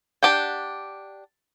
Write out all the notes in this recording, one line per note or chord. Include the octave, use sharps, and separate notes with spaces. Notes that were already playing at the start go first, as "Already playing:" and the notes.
D4 G4 F#5 G5